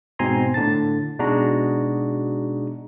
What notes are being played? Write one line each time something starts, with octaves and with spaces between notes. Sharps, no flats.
G#2 B2 C4 G#5 A#5 C6
A2 D3 A5 A6
B2 G#3 D4 D#4 F#4 A#5